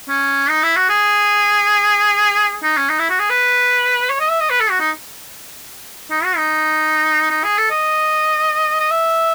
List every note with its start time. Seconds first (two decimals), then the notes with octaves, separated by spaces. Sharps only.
0.09 C#4
0.49 D#4
0.63 E4
0.76 F#4
0.89 G#4
2.63 D#4
2.77 C#4
2.90 D#4
2.99 E4
3.10 F#4
3.20 G#4
3.30 B4
4.09 C#5
4.20 D#5
4.30 E5
4.41 D#5
4.50 B4
4.60 A4
4.70 F#4
4.80 D#4
6.10 D#4
6.24 F#4
6.37 D#4
7.31 D#4
7.44 G#4
7.58 A4
7.70 D#5
8.80 D#5
8.91 E5